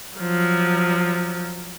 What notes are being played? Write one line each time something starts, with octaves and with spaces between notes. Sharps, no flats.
F3 F#3